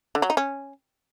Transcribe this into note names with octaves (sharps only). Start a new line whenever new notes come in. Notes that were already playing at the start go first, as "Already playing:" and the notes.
D3
F#3
D#4
C#4